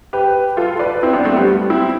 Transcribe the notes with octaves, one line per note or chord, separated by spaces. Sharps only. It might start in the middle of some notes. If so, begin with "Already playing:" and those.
G4 B4
F4 A4
B4 D5
C4 E4
B3 D4
A3 C4
G3 B3
C4 E4